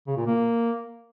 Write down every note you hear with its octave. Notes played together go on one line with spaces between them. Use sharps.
C#3
A#2
A#3